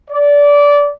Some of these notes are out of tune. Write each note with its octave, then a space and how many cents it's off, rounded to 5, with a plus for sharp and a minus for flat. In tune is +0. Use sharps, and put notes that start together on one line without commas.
D5 -20